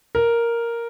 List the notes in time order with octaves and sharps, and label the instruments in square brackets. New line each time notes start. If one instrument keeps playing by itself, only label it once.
[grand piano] A#4